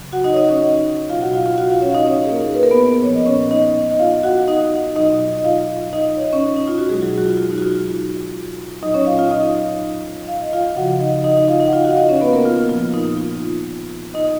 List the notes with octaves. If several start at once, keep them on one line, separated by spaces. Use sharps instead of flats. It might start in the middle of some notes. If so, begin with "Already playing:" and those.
Already playing: C#3 F#3
F#4 F#5
D#4 D#5
C#5
D#4 D#5
C#4 C#5
D#4 D#5
B2 F#3 F4 F5
F#4 F#5
F4 F5
F4 F5
F#4 F#5
F4 F5
C#4 C#5
F5
D#4 D#5
C#4 C#5
G#4
A#3 A#4
B4
A#4
B3 B4
A#2 F3 C#5
D#5
C#4 C#5
D#4 D#5
D#5
F4 F5
F#4 F#5
D#4 D#5
B2 F#3 D#4 D#5
D#5
F4 F5
D#4 D#5
C#5
D#5
C#4 C#5
D#4
F4
F#4
B2 F#3 G#3 G#4
F#3 F#4
F#4
F4
F4
D#4
F#4
F4
A#2 F#3 D#4 D#5
C#4 C#5
F4 F5
F4 F5
D#4 D#5
F5
D#5
F4 F5
C#3 F3 F#4 F#5
D#4 D#5
D#4 D#5
D#4 D#5
F4 F5
D#4 D#5
F#5
F4 F5
F#4 F#5
F5
D#4 D#5
C#4 C#5
B3 B4
A#3 A#4
F4
F4
A#2 F3 F4
D#4
F4
D#4 D#5